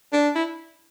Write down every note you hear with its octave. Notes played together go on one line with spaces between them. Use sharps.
D4
E4